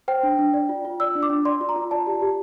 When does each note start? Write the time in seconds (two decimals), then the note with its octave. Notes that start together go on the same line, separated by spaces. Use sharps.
0.08 C5 G5
0.23 D4
0.39 D4
0.54 D5
0.69 F4
0.85 F4
1.00 D5 E6
1.15 D4
1.23 D6
1.30 D4
1.45 D5 C6
1.61 F4
1.69 A#5
1.76 F4
1.91 D5 A5
2.07 G4
2.22 G4